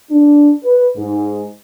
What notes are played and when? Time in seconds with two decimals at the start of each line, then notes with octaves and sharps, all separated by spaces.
0.11 D4
0.63 B4
0.96 G#2